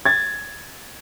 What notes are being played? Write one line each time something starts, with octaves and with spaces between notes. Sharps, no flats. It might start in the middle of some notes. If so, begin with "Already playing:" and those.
G#6 A6